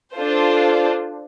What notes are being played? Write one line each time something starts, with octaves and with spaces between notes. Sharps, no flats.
D4 F4 A4 C5